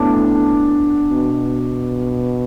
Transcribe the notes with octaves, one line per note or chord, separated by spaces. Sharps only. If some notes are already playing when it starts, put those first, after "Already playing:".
Already playing: A2 B3 D4
B2